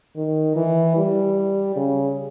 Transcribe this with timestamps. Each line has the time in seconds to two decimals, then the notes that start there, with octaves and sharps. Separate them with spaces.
0.16 D#3
0.56 E3
0.97 G3
1.76 C#3